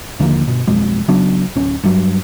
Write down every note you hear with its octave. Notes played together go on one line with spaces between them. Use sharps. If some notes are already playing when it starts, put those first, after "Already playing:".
D#2 D3 F3 A#3
G1 B2
B1 F2 B2 G#3
C#3 F#3 B3 D4
D1 C#4
G2 F#3